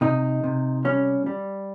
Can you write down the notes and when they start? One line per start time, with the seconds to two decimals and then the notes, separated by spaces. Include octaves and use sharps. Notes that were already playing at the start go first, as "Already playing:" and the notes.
0.01 C3 D#4
0.44 C3
0.85 G3 C#4
1.26 G3